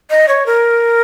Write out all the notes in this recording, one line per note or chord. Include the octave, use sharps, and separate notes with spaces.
D#5
C#5
A#4